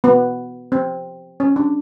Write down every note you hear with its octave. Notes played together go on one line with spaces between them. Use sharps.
B3
C4
C#4
D4